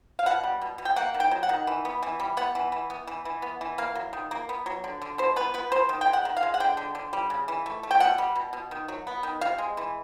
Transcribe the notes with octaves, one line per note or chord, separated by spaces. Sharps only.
F5
B2 F#5
G3
B2
B2
G5
A#3 F#5
D#3
G5
F#3
F#5
D#3
E3
B3
E3
G3
B3 F#5
E3
E3
B3
E3
E3
B3
E3
A#3 F5
F#3
D#3
A#3
B3
F#3
D3
D3
B2 C5
B3 B4
B3 B4
B2 C5
D#3
G5
G#3
F#5
D#3
F5
G#3
F#5
D3 G5
D3
D3
G3
C#3
E3
A3
A3
G5
B2 F#5
G3
B2
B2
D#3
F#3
B3
D#3
C3 F5
G#3
E3